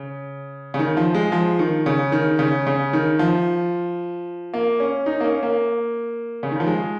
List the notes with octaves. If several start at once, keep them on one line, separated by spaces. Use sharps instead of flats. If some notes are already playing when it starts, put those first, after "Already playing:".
Already playing: C#3
C#3
D#3
F3
G#3
F3
D#3
C#3
D#3
C#3
C#3
D#3
F3
A#3
C#4
D#4
A#3
C#4
A#3
C#3
D#3
F3
G#3